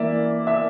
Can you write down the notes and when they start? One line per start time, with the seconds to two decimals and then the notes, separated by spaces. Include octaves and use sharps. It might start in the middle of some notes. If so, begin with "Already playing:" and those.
Already playing: E3 A#3 D5 E5
0.47 E5